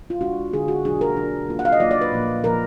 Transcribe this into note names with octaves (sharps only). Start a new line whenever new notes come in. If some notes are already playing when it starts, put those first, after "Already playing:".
F4
D3 G#3 D4 F#4
D3 G#3 D4 G#4
F#4
B2 F#3 D4 G#4
A#4
B2 F#3 D4
F#3 A#3 F4
F#5
F5
D#5
F#3 A#3 F4 D5
D5
B4
A#2 F3 A#3
A#2 F3 A#3 A#4